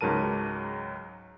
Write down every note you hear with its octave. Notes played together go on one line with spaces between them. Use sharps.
C#2 G#2 F#3 A#4 A5 D#7